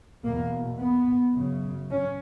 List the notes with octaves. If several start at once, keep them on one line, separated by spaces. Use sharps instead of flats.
E2 B2 A#3
B3
F#2 C#3
C#4